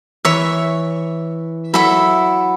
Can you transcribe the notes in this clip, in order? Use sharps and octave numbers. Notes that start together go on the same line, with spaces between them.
E3 C#5 E5 C#6
F#3 E4 A4 E5